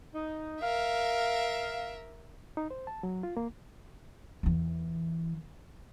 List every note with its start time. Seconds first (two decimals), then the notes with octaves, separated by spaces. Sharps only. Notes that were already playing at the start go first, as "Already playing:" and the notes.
0.14 D#4
0.62 A#4 E5 F5
2.57 D#4
2.71 C5
2.87 A5
3.03 F#3
3.23 F4
3.37 A#3
4.43 E2 E3